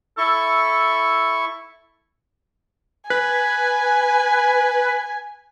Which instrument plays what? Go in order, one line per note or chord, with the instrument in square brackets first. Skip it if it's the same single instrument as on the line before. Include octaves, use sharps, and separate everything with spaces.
[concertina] E4 C#6 [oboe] A4
[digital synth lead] B4 [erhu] G#5